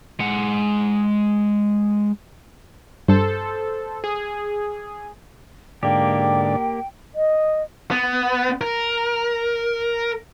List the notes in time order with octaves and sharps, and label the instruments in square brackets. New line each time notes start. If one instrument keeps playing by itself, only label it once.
[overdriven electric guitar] G#3 F#5
[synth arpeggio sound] G2 [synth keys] A4 C5
[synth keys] G#4
[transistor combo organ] G#2 D3 D5 [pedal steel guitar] A#3 G4 [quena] G5
[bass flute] D#5
[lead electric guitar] B3
A#4